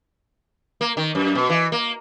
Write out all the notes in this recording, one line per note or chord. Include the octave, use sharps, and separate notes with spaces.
A#3
D#3
F#2
B2
E3
A#3